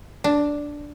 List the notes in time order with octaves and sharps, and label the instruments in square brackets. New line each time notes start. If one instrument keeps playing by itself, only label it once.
[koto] D4